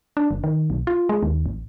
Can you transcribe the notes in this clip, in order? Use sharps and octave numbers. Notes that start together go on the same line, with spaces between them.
D4
F#1
D#3
B1
F4
G#3
D#2
A1